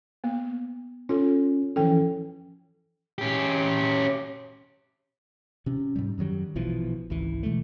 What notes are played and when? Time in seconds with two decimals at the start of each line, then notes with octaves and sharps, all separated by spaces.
0.24 A#3 B3
1.09 C#4 F4 A4
1.76 E3 F3 C#4 A4 G5
3.18 C#4 G4
5.66 C3 C#4
5.96 G#2 C3 G3
6.18 F#2 D#3 F#3 G3
6.55 A#1 B2 E3 F3
7.10 G#1 C#2 E3
7.43 B2 E3 G#3 A3